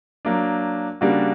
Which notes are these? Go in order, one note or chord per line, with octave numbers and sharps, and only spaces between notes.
F#3 A#3 D4
C#3 G3 A#3 D4 F#4